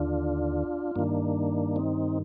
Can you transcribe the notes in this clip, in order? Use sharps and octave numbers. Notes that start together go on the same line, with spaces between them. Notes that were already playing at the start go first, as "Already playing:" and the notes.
Already playing: D#2 D3 D4 F4
G2 D#3 A#3 D4
C4 D#4